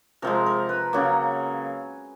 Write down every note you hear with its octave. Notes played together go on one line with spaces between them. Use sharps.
C3 F3 G#3 A#4
A#4
B4
C#3 F#3 A#3